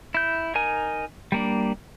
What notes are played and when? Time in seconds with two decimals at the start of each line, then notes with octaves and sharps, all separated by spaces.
0.14 E4 G6
0.55 D#4 A#4 G#5
1.32 G3 A#3 D4